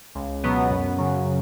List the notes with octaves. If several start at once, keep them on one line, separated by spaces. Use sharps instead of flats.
C#2
B2 F#3 B3
F#2
C#3 F#3